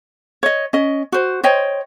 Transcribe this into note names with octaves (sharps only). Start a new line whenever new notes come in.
C#5 D#5
C#4 D#5
F#4 C5
C5 C#5 D#5 G5